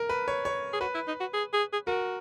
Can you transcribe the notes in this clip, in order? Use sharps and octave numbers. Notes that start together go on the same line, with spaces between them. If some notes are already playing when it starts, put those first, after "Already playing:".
Already playing: A#4
B4
C#5
C#5
G#4
F#4 B4
E4
D#4
F#4
G#4
G#4
G#4
F#4 A#4